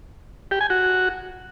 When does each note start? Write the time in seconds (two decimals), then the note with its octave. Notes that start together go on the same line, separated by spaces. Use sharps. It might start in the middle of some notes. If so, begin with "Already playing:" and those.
0.51 G4
0.61 G#5
0.70 F#4